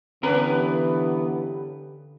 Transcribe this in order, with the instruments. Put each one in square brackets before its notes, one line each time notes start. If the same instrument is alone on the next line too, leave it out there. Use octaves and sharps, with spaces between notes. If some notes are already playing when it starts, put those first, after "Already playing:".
[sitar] G2 C#4 B4 [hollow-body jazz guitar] D3 A#4 [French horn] E3 [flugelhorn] B3